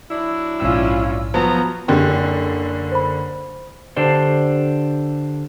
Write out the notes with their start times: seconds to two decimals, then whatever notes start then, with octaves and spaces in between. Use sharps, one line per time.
0.10 F#3 D4 E4
0.60 A#1 G#2 C#4 F4 E6
1.34 F3 F#3 B3 A#5
1.88 F#1 D3 G4 G5
2.92 C5 B5
3.96 D3 D4 G4 A4 C5